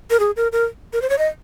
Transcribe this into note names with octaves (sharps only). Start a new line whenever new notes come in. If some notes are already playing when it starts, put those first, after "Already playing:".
A#4
G#4
A#4
A#4
A#4
C5
C#5
D#5